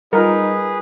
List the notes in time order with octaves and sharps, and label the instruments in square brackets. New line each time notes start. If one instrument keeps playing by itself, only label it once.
[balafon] G3 F4 [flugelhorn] D#4 [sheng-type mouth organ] G#4 B4 [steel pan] A#4